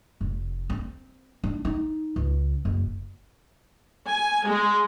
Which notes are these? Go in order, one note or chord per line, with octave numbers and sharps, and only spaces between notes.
F1
C4
D4
D#4
C#2
F#1
G#5
G#3